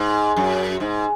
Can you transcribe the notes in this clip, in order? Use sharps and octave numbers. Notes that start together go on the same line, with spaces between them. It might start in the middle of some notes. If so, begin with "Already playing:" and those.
Already playing: G#2
F#2
G#2